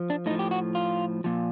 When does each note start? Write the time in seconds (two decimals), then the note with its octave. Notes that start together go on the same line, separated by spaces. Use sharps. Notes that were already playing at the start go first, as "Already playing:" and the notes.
Already playing: F3
0.10 D4
0.26 A2 D#4
0.31 F3
0.39 G4
0.51 F#4
0.75 F4
1.24 A#2 F3